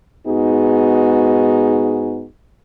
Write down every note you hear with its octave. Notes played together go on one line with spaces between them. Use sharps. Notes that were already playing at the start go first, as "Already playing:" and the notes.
G#2 B3 D#4 F#4 G#4